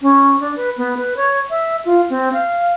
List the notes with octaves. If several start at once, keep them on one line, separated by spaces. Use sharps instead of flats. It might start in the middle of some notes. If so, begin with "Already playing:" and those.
C#4
D4
B4
B3
B4
C#5
E5
F4
C4
F5